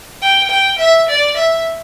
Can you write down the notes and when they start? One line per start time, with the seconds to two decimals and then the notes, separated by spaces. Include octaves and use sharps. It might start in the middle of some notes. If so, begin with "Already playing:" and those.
0.22 G5
0.50 G5
0.79 E5
1.08 D5
1.37 E5